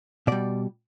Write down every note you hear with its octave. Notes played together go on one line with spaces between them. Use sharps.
B2 G3 D5